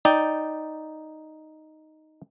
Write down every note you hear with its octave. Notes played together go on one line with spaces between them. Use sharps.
D#4 D5 G5